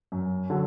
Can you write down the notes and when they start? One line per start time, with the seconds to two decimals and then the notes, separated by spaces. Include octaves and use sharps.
0.12 F#2
0.50 D3 F#3